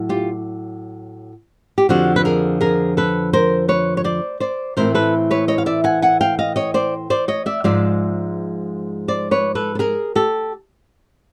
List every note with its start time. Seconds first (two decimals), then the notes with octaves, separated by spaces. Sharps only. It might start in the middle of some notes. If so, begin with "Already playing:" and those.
Already playing: A2 F#3
0.09 F4 G4
1.78 G4
1.89 F2 D3 F3 F#4
2.16 B4
2.25 G#4 A#4
2.61 G#4 A#4
2.97 A4 B4
3.33 A#4 C5
3.68 B4 C#5
3.97 C#5
4.04 C5 D5
4.40 C5 D5
4.77 A2 E3 G#3 C4 E4 A#4 C5
4.95 A4 B4
5.31 B4 C#5
5.48 C#5 D#5
5.58 F5
5.66 D5 E5
5.84 F#5 G#5
6.02 F#5 G#5
6.21 F5 G5
6.39 D#5 F5
6.56 C#5 D#5
6.74 C5 D5
7.10 C5 D5
7.28 C#5 D#5
7.46 D5 E5
7.64 G#2 F3 G#3 D5 E5
9.08 C5 D5
9.31 B4 C#5
9.55 A4 B4
9.75 A4
9.79 G#4 A#4
10.15 G4 A4